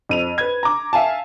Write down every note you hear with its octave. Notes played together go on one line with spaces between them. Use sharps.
F2 D#7 F7
B4 G#6
A#5 D6
E5 F5 G#5 A5